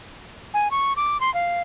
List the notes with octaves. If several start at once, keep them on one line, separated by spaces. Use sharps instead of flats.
G#5
C#6
D6
C6
F5